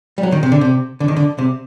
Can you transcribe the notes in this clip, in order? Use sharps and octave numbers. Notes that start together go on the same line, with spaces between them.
G3
F#3
D#3
C3
D3
C3
D3
D#3
D3
C3